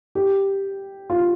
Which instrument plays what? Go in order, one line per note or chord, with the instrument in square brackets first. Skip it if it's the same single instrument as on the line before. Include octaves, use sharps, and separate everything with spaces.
[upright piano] G4
F4